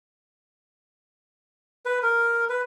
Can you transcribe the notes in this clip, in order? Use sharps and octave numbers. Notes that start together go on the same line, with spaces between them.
B4
A#4
B4